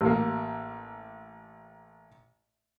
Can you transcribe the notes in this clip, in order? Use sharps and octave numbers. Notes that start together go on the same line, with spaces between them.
A1 A#3